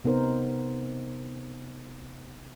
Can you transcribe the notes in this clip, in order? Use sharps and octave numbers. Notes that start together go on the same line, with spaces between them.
C3 B3 D#4 A#4 C5